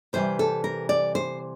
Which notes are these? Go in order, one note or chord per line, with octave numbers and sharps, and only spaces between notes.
C3 E3 G3 C5
A4
A#4
D5
C5